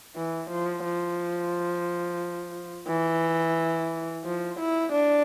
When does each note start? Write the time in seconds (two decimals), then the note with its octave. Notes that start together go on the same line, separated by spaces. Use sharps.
0.16 E3
0.50 F3
0.84 F3
2.88 E3
4.25 F3
4.59 E4
4.93 D4